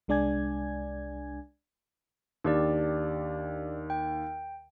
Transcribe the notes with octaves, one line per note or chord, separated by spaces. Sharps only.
C2 G#3 D4 D5 G#5 G#6
D#2 D4 G4 D5
G5